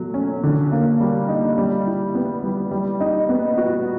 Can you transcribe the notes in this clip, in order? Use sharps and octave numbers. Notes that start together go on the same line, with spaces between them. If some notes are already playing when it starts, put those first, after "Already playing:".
Already playing: B2 F#3 A3
C#4
D3
A#3
G3
D#4
G3
E4
B3
G3
G3
D#4
B3
F#4